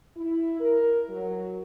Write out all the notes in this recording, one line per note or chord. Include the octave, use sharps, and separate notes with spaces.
E4
A#4
F#3